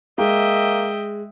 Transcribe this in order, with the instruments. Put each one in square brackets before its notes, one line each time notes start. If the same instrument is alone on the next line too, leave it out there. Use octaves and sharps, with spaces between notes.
[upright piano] G#3 [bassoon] A#3 [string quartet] D#5 E5 G5